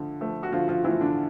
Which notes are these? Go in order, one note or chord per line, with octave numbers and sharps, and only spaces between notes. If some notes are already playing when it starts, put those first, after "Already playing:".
Already playing: D3 F3 A3
F3 A3
F#4
D3 F3 F4
F3 F4
E3 F3 A3 E4
D3 D4